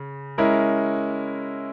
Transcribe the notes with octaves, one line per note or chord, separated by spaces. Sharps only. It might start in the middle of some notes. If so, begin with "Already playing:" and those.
Already playing: C#3
G#3 C#4 E4 A#4